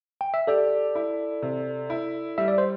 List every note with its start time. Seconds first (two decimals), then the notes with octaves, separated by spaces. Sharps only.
0.21 G5
0.34 E5
0.47 G4 A4 D5
0.95 E4
1.42 C3
1.90 E4
2.38 G3 E5
2.48 D5
2.58 C5